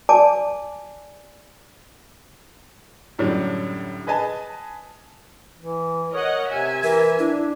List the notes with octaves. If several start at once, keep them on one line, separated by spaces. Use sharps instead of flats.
D5 G#5 A5 D6
F#2 A2 D3 F#3 G3
G#4 B4 D#5 G#5 A5
E3
A#4 C#5 D#5 F#5
C3 E5 G#5
E3 A#4
D4 E4